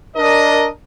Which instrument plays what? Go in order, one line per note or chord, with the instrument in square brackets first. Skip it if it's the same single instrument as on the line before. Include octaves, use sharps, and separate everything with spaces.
[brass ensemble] D4 A#4 D#5